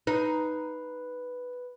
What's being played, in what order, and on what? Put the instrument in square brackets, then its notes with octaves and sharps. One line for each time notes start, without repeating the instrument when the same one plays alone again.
[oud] D#4 [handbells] B4